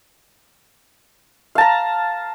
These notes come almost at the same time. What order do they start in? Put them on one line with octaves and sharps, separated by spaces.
F5 A5 A#5